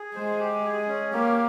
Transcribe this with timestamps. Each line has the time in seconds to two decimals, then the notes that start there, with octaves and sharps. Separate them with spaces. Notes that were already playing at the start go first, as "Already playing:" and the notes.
Already playing: G#4
0.15 G#3 C5
0.40 G4
0.64 G#4
0.88 C#4
1.12 A#3 G4